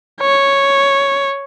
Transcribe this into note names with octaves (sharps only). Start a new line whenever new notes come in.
C#5